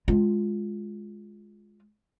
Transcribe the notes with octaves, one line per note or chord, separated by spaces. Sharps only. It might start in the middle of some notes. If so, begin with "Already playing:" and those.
G#3 F4